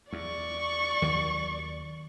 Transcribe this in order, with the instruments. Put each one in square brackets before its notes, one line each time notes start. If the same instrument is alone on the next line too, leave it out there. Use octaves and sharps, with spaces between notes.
[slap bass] E2 [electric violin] D5 C#6
[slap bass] D#2 D#3 F#3